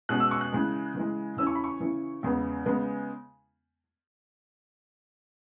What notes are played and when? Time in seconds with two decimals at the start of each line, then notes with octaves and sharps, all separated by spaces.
0.09 B2 G#3 C#4 F#6
0.20 E6
0.31 C#6
0.41 F#6
0.52 C#3 E3 G#3
0.95 C#3 E3 G#3
1.37 C#3 E3 C#4 E6
1.47 C#6
1.55 B5
1.64 C#6
1.80 C#3 E3 C#4
2.23 E2 C#3 G#3 B3
2.66 C#3 G#3 B3